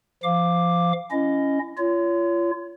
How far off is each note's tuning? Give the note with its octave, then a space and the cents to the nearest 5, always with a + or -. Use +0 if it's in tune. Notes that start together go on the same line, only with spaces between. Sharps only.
F3 -20 F5 +0 D6 +5
C#4 +0 E4 +25 D#5 +0
F4 -30 C#5 +25